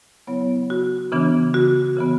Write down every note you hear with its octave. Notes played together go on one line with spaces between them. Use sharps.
C#3 F#3 B3 E4 C#5
F#4
C#3 E3 B3 D4
F#4
C#3 E3 B3